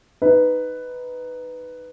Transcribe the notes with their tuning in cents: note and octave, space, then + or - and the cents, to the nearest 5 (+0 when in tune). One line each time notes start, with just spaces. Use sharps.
D#4 +0 B4 +5